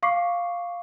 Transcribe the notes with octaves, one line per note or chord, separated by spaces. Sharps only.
F5 C#6 D6 C7